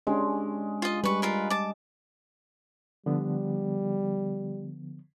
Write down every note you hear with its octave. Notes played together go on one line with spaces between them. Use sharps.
G#3 C#4 D4 G4
F4 D#5
G3 G4 B4 C#6
F4 A#4 B4
A5 D6
D3 F3 G3 B3